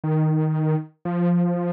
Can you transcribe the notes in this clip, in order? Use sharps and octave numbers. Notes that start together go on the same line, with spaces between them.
D#3
F3